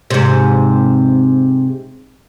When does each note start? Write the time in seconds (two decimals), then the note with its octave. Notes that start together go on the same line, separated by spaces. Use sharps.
0.10 G#2 C3